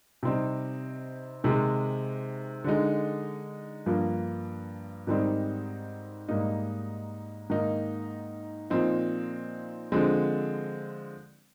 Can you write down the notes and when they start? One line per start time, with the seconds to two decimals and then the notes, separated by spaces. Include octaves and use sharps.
0.23 C3 G3 C4 D#4
1.44 C3 D#3 G#3
2.64 D3 G#3 D#4
3.86 G2 F3 A#3
5.07 G#2 D#3 G3 C4 D#4
6.29 G#2 G3 A#3 D#4
7.50 G#2 D#3 A#3 D#4
8.70 A#2 F3 C4 D#4
9.92 D3 F3 G#3 C4